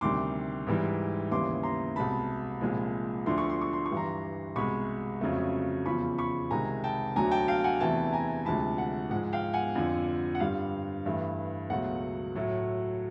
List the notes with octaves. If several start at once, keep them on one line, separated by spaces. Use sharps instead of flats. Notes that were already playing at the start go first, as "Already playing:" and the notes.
D2 C3 D#3 G3 C6 D6
G#2 E3 G3
D#2 C#3 E3 G3 C6 D6
A#5 C6
C2 B2 G#3 A5 B5
C2 A#2 F3 G#3
D2 D3 F3 A3 C6
C#6
C6
C#6
C6
C#6
G2 E3 G3
A#5 C6
C2 B2 G#3 B5 C#6
F2 C#3 F#3 A3
E2 C#3 F3 B5 C#6
B5 C#6
C2 C3 D#3 G#3 G#5 A#5
G5 A5
D2 D3 F#3 A3 G#5 A#5
G5 A5
F5 G5
F#5 G#5
E2 C3 E3 A3 G5 A5
G#5 A#5
D2 C3 F3 G#3 A5 B5
F#5
G#2 F3 G#3 F#5
F5 G5
F#5 G#5
F2 D3 F3
F#5
G2 D3 G3 F5
G2 E3 A3
C#2 B2 F#3 A3 F#5
A2 F#3 A3